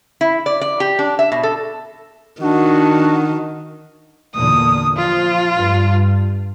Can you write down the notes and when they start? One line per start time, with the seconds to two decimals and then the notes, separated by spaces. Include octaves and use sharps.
0.21 E4
0.46 D5
0.61 D5
0.80 G4
0.99 D4
1.19 E5
1.32 B2
1.43 A4
2.42 D#3 D4 F#4
4.35 E2 A#2 D3 D#6
4.97 F3 F4
5.54 G2